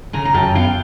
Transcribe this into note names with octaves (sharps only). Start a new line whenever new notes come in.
C#3 G#5 A#5
A#5
F#2 G5 A5
B3 F5 G5